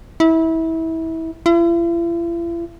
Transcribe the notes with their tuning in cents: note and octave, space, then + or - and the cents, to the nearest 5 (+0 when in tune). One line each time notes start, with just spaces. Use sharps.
E4 -25
E4 +45